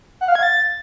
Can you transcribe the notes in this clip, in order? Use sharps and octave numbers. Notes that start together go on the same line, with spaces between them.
F#5
F5
G#6
A6